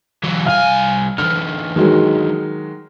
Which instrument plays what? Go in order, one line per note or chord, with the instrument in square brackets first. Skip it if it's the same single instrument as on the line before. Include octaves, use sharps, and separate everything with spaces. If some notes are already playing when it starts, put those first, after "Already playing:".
[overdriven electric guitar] E3 F#3
[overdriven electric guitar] C2 G#5 [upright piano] F5 F6
[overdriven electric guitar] D3 E3 [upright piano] F6
[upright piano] D#3 F#3 G#3